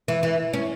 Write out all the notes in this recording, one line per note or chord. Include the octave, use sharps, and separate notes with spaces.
E3
E3
C#4